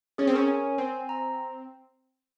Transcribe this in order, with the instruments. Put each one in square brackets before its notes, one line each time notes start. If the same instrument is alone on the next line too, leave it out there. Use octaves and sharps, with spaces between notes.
[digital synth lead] C#4 [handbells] G#4
[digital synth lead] C4
[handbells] A#4
[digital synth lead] C#4
[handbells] G#5
[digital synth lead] C4 [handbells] G#5
[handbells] A#5